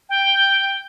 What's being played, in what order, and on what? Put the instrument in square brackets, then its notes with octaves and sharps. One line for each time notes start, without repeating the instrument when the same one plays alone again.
[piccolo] G5